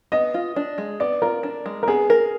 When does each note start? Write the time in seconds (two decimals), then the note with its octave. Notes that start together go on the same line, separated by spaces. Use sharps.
0.12 B3 D#5
0.34 F4
0.56 D4
0.78 G#3
1.00 B3 D5
1.22 F4 A#4
1.43 D4
1.66 G#3
1.83 A#4
1.88 B3 G#4
2.10 A#4